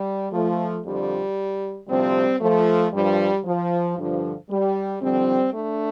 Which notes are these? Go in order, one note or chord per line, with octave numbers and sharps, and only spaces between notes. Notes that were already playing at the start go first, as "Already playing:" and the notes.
Already playing: G3
F3 A3
F2 D3 F3 G3
D2 C3 F3 G3 C4
F3 A3
G2 F3 G3
F3
G2 D3 F3
G3
F2 D3 F3 G3 C4
A3 D4